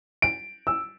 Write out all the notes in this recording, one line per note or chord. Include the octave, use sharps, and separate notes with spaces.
D7
E6